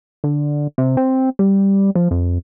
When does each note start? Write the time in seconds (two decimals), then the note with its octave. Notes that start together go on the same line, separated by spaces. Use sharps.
0.24 D3
0.78 C3
0.97 C4
1.39 G3
1.95 F3
2.11 F2